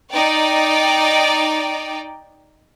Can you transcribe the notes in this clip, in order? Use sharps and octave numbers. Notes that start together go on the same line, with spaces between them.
D#4 D5 G5